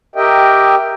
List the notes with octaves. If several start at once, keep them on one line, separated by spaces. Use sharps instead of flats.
G4 A#4 D#5 E5 G5